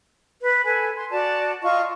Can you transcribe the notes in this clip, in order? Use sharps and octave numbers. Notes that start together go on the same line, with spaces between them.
B4
A4 B4 G#5
C6
F#4 D5 A5
F4 D#5 C#6